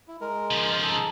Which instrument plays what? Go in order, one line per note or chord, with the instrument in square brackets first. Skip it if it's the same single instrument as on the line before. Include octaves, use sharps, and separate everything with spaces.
[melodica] E4
G#3 A#4
[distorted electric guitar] C#3 F3
[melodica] D#4 G#4 A4